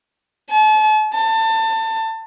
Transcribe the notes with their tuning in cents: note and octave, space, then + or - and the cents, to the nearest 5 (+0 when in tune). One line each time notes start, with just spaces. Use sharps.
A5 -40
A5 +25